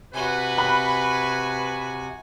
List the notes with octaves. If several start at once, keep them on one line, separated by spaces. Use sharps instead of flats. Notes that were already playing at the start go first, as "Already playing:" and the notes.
C3 F#4 B4 G#5
B5